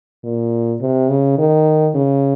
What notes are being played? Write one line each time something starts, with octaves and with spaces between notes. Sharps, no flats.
A#2
C3
C#3
D#3
C#3